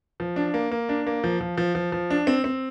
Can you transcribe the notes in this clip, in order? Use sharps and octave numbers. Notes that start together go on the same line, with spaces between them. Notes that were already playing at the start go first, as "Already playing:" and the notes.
F3
D4
A#3
A#3
D4
A#3
F3
F3
F3
F3
F3
D4
C4
C4